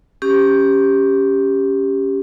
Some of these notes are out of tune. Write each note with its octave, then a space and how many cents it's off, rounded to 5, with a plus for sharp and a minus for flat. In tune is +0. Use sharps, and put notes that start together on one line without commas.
C#4 +0 G4 +5